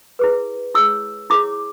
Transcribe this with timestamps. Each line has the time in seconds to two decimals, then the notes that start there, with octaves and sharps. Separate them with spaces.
0.19 E4 G#4 B4
0.75 E4 G#4 C#5 E6
1.30 E4 G#4 C#5 D6